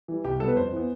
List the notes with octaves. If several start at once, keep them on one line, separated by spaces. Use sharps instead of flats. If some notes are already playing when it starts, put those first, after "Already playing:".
E3 G3
C2 G4
B2 G3 B3 A4
B4
F2 C5
E3 B3